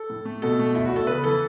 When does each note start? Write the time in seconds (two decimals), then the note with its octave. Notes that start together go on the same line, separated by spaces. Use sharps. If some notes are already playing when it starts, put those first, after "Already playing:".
Already playing: A4
0.10 A2
0.25 A3
0.42 B2 A4
0.59 A3
0.75 E2 E4
0.85 F#4
0.91 E2
0.96 A4
1.07 C#3 B4
1.24 E3 A4